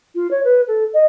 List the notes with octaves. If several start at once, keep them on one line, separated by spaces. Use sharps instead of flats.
F4
C#5
B4
A4
D#5